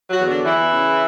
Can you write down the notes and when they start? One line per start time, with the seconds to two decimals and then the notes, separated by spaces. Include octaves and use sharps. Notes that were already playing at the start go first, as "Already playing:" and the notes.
0.10 F#3 F#4
0.19 E2
0.26 D3 D4
0.44 E2 E3 E4
0.71 C#3